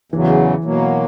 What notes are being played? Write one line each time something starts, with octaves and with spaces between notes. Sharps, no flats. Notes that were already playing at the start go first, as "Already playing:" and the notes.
E2 C#3 E3 F#3
B2 F#3 A#3